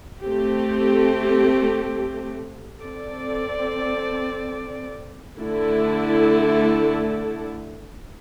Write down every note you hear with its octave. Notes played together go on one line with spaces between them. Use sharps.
A3 C4 G4
C4 A4 D5
D3 A3 E4 A4